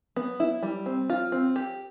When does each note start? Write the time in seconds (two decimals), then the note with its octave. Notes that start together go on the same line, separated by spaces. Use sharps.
0.16 B3
0.40 E4
0.63 G3
0.86 C4
1.10 F4
1.32 C4
1.56 G4